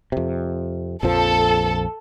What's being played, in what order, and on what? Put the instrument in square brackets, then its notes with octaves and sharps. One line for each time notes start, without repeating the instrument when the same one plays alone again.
[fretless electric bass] F2 C3
[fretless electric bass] A#1 F2 F3 [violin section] A4